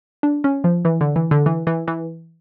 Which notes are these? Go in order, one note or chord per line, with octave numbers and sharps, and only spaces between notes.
D4
C#4
F3
E3
D3
E3
D3
E3
E3
E3